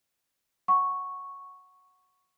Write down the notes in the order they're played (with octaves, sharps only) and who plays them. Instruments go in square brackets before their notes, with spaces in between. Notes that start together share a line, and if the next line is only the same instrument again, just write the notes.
[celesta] F#5 C#6